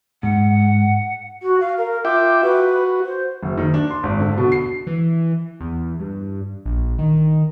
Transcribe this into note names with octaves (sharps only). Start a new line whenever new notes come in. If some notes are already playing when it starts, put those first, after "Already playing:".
G#2 F#5
F#4
F5
A#4
F4 E5 G5 D6
F#4 B4
C5
F#1
D#3
D4
C6
G#1
D3
B2
C7
E3
E2
G2
A#1
D#3